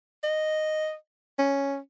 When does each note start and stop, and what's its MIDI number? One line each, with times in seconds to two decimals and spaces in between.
0.24 0.94 75
1.39 1.77 61